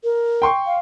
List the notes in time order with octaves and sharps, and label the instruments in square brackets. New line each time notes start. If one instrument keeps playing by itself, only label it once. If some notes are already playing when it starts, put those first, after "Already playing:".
[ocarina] A#4
[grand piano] G5 C6 C#6
[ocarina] F5